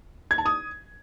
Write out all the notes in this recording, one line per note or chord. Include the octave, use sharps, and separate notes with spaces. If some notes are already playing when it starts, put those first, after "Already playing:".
G#6
A5
D#6